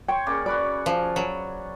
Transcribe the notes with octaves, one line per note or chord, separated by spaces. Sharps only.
C5 C#5 G5
C#3 A#3 D5
F#4 B4 D5 B5
F3
F#3